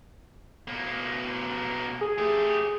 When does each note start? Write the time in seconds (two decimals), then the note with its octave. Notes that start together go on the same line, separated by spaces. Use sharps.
0.68 B2 A#3
2.01 G#4
2.18 A3 G4